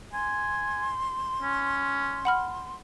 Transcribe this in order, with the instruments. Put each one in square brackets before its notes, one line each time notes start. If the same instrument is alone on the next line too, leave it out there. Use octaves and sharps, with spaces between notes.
[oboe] G#5 [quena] C6
[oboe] C#4
[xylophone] F#5 B5 F6